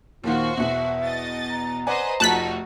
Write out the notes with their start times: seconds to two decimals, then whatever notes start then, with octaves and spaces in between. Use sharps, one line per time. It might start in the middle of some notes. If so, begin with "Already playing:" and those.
0.24 D#2 A#2 D#3 F4 F#4 C5
0.57 E2 B2 E5
1.04 D#5 A6
1.50 A#5
1.87 B4 C5 D5 D#5 F#5 G#5
2.20 F1 F3 A3 D#4 F#4 A5 F#6 B6